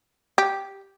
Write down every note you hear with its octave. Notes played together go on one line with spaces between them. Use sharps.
G4